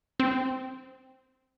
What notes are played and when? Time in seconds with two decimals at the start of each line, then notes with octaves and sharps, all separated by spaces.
0.20 C4